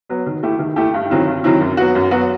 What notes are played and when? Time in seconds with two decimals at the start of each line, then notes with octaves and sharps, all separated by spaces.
0.09 F#3 B3
0.26 D#3
0.43 A3 E4 G4
0.59 D#3
0.76 A3 E4 G4
0.94 G2
1.10 D#3 F#3 C4 E4
1.27 G2
1.44 D#3 F#3 C4 E4
1.60 F#2
1.77 F#3 B3 F#4
1.95 F#2
2.11 F#3 B3 F#4